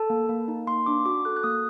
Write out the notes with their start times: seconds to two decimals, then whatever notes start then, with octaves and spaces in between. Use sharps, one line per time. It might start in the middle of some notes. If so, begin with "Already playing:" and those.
Already playing: A4 A5
0.10 A#3
0.29 A#3
0.48 D#4
0.67 A#3 C6
0.86 D4 D6
1.06 F#4 D6
1.25 A4 F#6
1.36 F#6
1.43 A#3 D#6